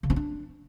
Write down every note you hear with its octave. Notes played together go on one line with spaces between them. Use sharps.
C#3
C#4
D4